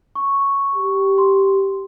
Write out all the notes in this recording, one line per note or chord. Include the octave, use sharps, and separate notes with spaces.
C#6
G4
C6